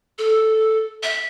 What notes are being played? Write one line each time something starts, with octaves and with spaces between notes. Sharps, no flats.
A4
E5